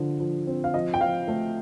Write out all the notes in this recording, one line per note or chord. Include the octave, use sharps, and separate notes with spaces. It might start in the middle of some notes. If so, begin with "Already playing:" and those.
Already playing: D3 F3
F3
C4
F5
F3 D#5
G5
F3 F5
A3